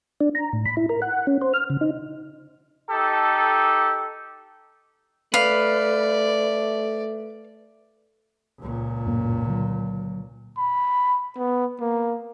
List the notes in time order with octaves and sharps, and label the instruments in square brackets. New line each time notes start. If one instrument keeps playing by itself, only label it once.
[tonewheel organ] D4
A#5
A2
B5
E4
A#4
F#5
C#4
C5
F6
C#3
D#4
[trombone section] D#4 G4 A4
[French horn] A3 [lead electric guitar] B4 [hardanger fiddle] D5 [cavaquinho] F5
[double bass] C#2 A#2
[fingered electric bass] F#2 A2 A#3
D3 F#3
[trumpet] B5
B3
A#3